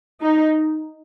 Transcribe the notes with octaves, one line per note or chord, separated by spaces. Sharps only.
D#4